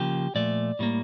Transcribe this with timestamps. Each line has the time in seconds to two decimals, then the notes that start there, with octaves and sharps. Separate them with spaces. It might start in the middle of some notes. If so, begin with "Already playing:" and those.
Already playing: C#3 F3 A#3 G4
0.35 A#2 F3 A3 D5
0.79 A2 G3 A#3